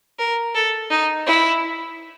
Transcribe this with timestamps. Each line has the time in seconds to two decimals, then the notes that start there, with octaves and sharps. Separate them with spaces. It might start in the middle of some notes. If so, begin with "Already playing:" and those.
0.19 A#4
0.55 A4
0.91 D#4
1.27 E4